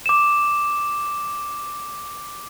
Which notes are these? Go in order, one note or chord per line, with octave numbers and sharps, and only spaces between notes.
D6 E7